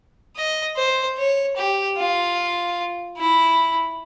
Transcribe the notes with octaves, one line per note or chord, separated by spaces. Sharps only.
D#5
C5
C#5
G4
F4
E4